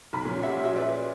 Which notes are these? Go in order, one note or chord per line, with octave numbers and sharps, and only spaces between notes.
B1 B5 B6
A#2 F3 C#4
G4 E5 F#5
F#4 G#4 E5
B4 D5